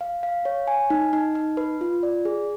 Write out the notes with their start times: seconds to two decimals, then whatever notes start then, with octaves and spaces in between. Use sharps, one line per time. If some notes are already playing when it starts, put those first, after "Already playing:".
0.01 F5
0.23 F5
0.45 C#5
0.67 G#5
0.90 D#4
1.13 D#4
1.35 D#4
1.57 B4
1.81 F4
2.03 D5
2.25 G#4